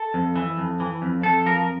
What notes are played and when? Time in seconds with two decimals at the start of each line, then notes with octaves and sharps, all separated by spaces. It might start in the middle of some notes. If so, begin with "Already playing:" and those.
Already playing: A4
0.14 F2
0.36 E3
0.57 F2
0.80 E3
1.02 F2
1.23 F2 A4
1.46 F3 A#4